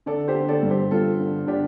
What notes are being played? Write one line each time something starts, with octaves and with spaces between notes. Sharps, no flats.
D3 A4 D5
G4 C5
D3
A4 D5
G2
G4 C5
G2 F4 A4
D3
D3 D4 G4